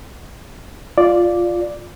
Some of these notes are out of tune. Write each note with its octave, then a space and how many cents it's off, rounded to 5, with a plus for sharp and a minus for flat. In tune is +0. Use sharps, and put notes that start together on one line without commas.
F4 +0 D5 +0